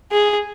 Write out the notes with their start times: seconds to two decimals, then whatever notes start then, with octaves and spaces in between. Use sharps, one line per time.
0.12 G#4